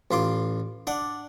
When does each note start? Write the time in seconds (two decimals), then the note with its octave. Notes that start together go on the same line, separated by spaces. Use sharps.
0.11 A1 F4 C6 D6
0.87 D4 D5 F#5